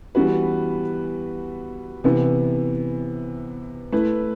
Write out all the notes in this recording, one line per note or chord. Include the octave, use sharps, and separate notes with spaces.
E3 G3 B3 F#4 B4
C3 E3 B3
A3 E4 B4